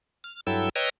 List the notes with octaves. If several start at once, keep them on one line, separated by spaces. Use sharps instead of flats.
F6
G2 F#3 E4 A4 G5 E6
B4 C#5 D#5 G5 A#5 E6